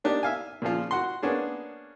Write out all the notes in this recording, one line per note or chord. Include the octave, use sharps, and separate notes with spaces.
A#3 D4 D#4 G4
E5 F5 G#5
A#2 C#3 F3 F4
F#4 F#5 C6
A#3 B3 C#4 D4 G#4